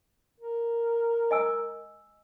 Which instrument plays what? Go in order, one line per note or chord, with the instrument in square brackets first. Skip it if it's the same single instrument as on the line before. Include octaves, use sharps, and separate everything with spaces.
[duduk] A#4
[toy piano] D#5 G#5 E6